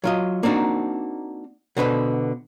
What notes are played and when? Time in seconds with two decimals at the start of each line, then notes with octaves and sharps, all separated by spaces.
0.04 F#3 F4 D#5
0.43 A#3 C4 D4 D#4 F#4
1.77 B2 D3 B4 C5